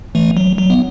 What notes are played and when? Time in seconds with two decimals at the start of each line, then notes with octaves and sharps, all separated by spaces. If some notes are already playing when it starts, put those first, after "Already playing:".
0.15 E3 A3
0.37 F#3
0.58 F#3
0.70 B3